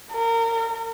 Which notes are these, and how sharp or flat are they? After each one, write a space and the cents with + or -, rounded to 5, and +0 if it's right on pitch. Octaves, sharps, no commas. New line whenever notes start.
A#4 -25